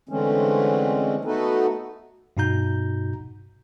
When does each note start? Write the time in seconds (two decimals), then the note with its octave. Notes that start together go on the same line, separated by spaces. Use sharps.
0.09 D3 E3 G#3 A3 C4 C#4
1.25 A3 B3 D#4 F#4 A4 B4
2.37 G2 B2 D#4 F#4 A#5 G6